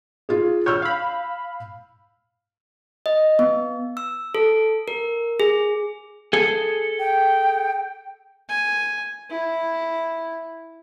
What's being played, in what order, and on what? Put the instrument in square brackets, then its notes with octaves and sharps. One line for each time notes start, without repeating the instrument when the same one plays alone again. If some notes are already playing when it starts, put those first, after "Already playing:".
[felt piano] F4 G#4
[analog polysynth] C#5 [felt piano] E6 F6 G6
[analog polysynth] F5 B5
[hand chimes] D#5
B3
E6
A4
A#4
G#4
[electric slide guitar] G#4 A4
[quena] G5
[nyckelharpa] G#5
E4